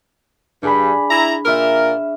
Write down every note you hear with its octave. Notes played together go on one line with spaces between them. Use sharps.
G2 D4 G#4 B5
E4 A#5
A#2 A#4 E5 F6